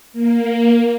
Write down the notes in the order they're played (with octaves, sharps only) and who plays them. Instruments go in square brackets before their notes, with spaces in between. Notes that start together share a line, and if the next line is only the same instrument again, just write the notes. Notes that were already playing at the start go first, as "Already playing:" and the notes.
[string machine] A#3